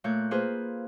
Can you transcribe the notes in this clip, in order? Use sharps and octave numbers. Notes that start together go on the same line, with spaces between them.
A#2 A3 C#5 F#6 G6
A#3 F4 G#4 B4 C5